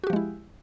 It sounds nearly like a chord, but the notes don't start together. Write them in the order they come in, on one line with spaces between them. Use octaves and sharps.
F#4 G4 F3 G#3 E4